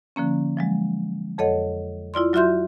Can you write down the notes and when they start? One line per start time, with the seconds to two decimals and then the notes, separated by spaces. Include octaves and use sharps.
0.16 D3 F3 A#3 C#4
0.57 F3 F#3 G#3
1.38 F2 A4 C#5 D#5 F#5
2.14 E4 F4 D5 C6
2.33 F#3 F4 F#4 E5 C6 G6